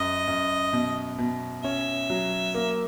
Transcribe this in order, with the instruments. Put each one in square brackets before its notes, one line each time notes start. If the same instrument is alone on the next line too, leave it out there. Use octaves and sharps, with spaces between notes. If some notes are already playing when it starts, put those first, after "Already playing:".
Already playing: [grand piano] F#2 [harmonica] D#5
[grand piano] F#2
B2
B2
[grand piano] C#4 [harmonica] E5
[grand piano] F#3
A#3